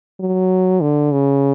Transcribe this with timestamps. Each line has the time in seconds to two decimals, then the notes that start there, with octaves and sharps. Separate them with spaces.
0.20 F#3
0.81 D3
1.12 C#3